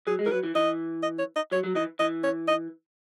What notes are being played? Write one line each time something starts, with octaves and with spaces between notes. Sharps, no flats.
F#3 G#4
G#3
E3 A#4
F#3 B4
E3
E3 D#5
D#5
C#5
D#5
F#3 C#5
F#3
E3 D#5
E3 D#5
C#5
D#5